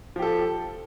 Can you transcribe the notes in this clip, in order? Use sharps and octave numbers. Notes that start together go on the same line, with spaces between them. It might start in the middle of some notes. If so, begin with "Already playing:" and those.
F3 G4 A4